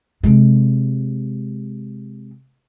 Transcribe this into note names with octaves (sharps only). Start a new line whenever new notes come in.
C3 G#3